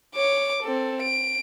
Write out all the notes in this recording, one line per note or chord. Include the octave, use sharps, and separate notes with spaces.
C#5 D6
C4 A4
D7